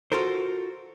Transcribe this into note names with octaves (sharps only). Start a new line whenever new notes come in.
F4 F#4 A4 A#4 C5